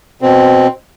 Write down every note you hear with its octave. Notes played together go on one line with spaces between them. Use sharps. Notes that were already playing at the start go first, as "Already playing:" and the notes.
B2 C4